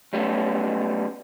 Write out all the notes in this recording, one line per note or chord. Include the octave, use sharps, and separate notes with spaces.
F#3 G3 A3 B3 C#4